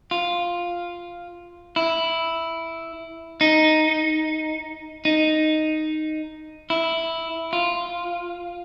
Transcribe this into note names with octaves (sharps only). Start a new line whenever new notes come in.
F4
E4
D#4
D#4
E4
F4